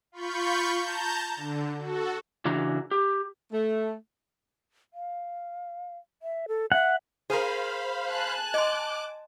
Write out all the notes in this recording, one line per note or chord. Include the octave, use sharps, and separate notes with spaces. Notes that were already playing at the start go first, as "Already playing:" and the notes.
F4 B5 C#6 G6
A5 A#5 G6
D3
F#4 A4
C#3 E3 D4 F#4 A#5
G4
A3
F5
E5
A4
E5 F#5
G#4 A#4 C5 F5 B5
G#5 A5 F#6
D#5 C6 D6